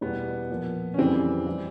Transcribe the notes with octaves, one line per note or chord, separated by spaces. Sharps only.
E2 B2 G3 B3
A#2 F3
C#4
F2 C#3 E3 G3 C4
E3 G3